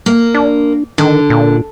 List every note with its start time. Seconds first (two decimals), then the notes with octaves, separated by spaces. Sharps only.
0.06 A#3
0.34 D4
0.98 D3 D#3
1.30 A#2